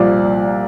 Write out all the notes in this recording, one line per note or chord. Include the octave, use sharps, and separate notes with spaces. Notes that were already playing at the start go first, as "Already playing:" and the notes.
Already playing: C2 A#2 F3 D5